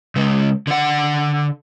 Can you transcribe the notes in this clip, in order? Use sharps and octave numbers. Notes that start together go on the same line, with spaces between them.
C#3 G#3
D3 F#5